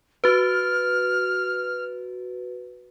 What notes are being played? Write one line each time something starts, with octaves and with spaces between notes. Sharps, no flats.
F#4 B4 F6